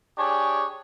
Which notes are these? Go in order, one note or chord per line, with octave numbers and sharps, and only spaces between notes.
D4 G4 G#4 C#5 G#5